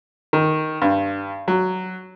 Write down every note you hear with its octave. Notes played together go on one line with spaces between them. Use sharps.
D#3
G2
F#3